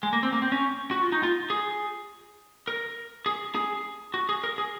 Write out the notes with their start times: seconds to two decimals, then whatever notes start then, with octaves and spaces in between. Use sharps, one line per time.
0.03 G#3
0.13 A#3
0.23 C4
0.33 A#3
0.42 C4
0.52 C#4
0.91 F#4
1.02 F4
1.12 D#4
1.23 F4
1.50 G#4
2.68 A#4
3.26 G#4
3.55 G#4
4.14 F#4
4.29 G#4
4.44 A#4
4.58 G#4